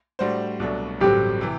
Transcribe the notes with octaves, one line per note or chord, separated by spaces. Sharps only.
A2 G3 D4 F#4 C5
C2 B2 F#3 A3 D4
A1 G2 D3 F#3 C4 G4
C3 E3